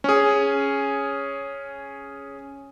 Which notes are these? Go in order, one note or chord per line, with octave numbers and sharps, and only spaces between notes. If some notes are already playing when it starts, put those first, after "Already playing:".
C#4 G#4